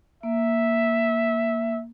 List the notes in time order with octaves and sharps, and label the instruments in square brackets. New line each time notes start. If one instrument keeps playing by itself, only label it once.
[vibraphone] A#3 [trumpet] E5